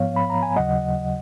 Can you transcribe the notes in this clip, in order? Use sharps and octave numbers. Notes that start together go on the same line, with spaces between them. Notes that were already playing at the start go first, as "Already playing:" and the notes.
Already playing: G#2 F3 B3 C#5 F5
B5
A#5
G#5
D#2 C#3 F#3 D#5 F#5